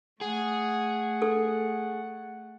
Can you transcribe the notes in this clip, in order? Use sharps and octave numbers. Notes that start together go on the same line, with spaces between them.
A3 G#4 F#5
A4